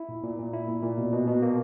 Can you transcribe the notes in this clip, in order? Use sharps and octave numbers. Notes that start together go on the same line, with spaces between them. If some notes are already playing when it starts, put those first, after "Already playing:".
Already playing: E4
A#2
A#2
A#2
E4
A#2
A#2
B2
B2
B2
A#3